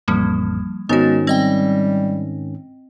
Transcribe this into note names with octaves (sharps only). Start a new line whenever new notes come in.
A1 F2 F3 G3 A#3
G#2 D#3 G#3 B3 C#4 F#4
G3 C4 D#5 G5